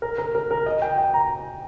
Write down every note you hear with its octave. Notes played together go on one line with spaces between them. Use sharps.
A#4
A#4
A#4
A#4
D#5
G5
G5
A#5